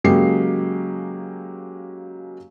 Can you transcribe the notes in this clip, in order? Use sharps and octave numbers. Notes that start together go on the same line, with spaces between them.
C#3 F#3 G#3 A#3 G4 C7